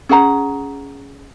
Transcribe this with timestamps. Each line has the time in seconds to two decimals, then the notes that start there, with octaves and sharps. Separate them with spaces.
0.09 C#4 G#4 F#5 A#5